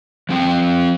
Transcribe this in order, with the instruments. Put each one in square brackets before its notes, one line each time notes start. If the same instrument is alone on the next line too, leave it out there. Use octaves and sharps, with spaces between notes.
[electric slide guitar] F3 C4 G5